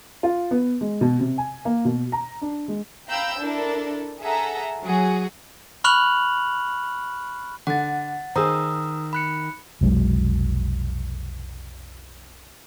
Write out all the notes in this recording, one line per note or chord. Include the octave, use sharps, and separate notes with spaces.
F4
B3
G#3
B2
C3
G#5
A#3
B2
A#5
D4
G#3
F5 G5 A#5 B5 E6 G6
D4 E4 A4 A#4
G#4 A4 E5 F#5 A#5
F#3 F#4 G#4
B5 C#6 F6 F#6 F7 F#7
D3 F#5 A6
D#3 G#4 C5 A#5 D#6 E6
B5 F#6 C#7
F1 B1 F#3 G#3